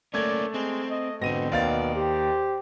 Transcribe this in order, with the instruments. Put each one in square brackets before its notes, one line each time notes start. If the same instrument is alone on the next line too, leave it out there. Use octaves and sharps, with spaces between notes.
[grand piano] A3 G#6 [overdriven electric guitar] A#3 C#4 [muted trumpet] D5
[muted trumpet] G#3 [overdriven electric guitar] C4
[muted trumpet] D#5
[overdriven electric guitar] G#2 D3 [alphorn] B2 [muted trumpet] C4 [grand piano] A#6 D#7
[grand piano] D#2 F5 A6 [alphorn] B2 [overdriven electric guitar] D5
[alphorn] G4 [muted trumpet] C5